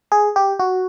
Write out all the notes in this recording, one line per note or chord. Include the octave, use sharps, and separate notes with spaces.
G#4
G4
F#4